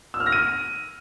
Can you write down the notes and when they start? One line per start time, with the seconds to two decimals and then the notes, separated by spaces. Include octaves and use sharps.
0.14 E6
0.20 F6
0.26 A#6
0.32 D#7